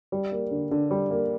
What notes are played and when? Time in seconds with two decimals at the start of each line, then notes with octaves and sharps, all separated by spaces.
0.12 G3
0.32 A#3
0.51 D3
0.71 D3
0.91 G3
1.11 A#3